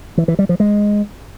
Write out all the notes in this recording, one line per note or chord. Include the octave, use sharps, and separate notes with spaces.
E3
E3
G3
F3
G#3